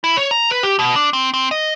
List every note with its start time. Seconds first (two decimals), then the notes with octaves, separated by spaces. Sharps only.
0.04 E4
0.17 C#5
0.31 A#5
0.50 B4
0.63 G4
0.79 B2
0.96 D4
1.13 C4
1.34 C4
1.51 D#5